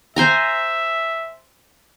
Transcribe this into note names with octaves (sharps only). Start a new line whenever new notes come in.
C5 E5 G#5 A#5